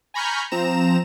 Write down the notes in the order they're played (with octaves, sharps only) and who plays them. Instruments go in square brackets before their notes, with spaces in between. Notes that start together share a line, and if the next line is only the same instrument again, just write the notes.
[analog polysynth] G#5 A#5 B5 C#6 F6 G6
F3 C4 A#5 E7